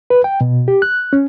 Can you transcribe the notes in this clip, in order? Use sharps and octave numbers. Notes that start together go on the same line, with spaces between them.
B4
G5
B2
G4
F#6
C#4